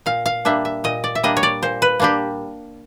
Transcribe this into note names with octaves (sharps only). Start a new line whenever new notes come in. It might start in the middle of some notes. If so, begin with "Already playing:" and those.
A#2 F5
F5
G3 A#3 D4 E5
E5
A#2 D#5
D5
E5
G3 A#3 D4 D#5
C#5
D5
A#2 C5
B4
G3 A#3 D4 G4